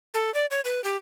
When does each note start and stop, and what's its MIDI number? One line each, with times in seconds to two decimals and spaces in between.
0.14 0.33 69
0.34 0.46 74
0.51 0.61 73
0.65 0.83 71
0.84 0.97 67